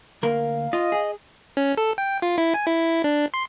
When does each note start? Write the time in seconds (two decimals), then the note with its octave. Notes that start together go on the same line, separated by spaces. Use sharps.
0.23 D2 A#3 A#4 F5
0.73 F4 D#5
0.92 G#4
1.57 C#4
1.78 A4
1.98 G5
2.22 F4
2.38 E4
2.54 G#5
2.67 E4
3.04 D4
3.34 C6